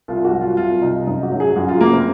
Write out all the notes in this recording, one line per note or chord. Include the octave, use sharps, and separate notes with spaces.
C2 F4
F#4
F#3
F4
C2 F4
C3 D#4
F#2 D#4
F#4
F#3
G#4
F#2 F#4
F4
C#3 A#3
C4